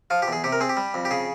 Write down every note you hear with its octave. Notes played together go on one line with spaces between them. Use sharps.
F3 F4
G4
E2 G#4
C3 G4
A#4
C4 G#4
G4
G3
F2
G4
C#3 G#4